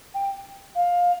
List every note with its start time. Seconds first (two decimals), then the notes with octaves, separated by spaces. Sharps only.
0.14 G5
0.75 F5